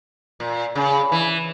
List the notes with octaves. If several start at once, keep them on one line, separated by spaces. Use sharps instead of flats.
A#2
C#3
E3